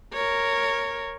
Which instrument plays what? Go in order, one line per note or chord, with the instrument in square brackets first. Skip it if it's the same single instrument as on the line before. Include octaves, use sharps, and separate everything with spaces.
[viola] A#4 C#5